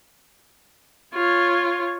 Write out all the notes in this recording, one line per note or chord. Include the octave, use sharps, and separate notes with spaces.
F4 C#5